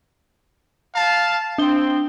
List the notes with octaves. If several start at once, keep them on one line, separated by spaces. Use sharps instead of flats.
F5 A5
C4 D4 G7